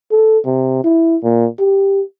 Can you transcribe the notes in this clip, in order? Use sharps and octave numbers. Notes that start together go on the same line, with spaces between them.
A4
C3
E4
A#2
G4